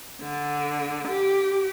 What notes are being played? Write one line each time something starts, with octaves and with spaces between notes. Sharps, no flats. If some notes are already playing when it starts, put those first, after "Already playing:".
D3
G4